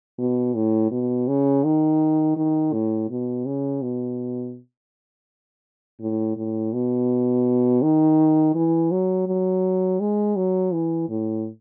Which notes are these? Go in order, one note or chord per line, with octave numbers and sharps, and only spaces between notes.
B2
A2
B2
C#3
D#3
D#3
A2
B2
C#3
B2
A2
A2
B2
D#3
E3
F#3
F#3
G#3
F#3
E3
A2